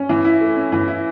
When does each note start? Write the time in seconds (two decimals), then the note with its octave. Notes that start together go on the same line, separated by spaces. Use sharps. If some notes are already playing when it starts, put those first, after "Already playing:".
Already playing: C#4
0.09 E3
0.25 E4
0.41 A3
0.56 C#4
0.72 E3
0.88 E4